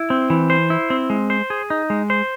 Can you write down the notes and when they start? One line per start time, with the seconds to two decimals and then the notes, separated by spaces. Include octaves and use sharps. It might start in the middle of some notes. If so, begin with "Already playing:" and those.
Already playing: E4
0.10 C4
0.30 E3
0.50 C5
0.70 E4
0.90 C4
1.10 G#3
1.30 C5
1.50 G#4
1.70 D#4
1.90 G#3
2.10 C5